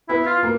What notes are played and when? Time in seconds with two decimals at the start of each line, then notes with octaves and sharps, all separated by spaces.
0.09 B3 E4
0.26 F4
0.43 A#3